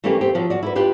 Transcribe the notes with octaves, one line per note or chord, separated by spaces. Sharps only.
E3 A3 A#3 C#4 G4 B4
C4 G4
F3 F#3
F#4 D5
E4 A#4 B4
D4 F4 G4 B4